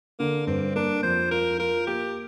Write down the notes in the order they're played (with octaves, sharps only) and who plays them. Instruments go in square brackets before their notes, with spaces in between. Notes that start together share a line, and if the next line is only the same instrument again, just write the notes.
[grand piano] D3 [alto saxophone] A#3
[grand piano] G2 [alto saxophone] C4
[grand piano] A#3 [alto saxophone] D4
[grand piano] F2 [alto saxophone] C5
[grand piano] F4 [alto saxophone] A#4
[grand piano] F4 [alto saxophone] A#4
[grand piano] A#3 [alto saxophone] G4